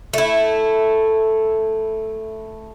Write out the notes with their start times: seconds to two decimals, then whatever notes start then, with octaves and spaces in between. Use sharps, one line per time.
0.14 A3 E4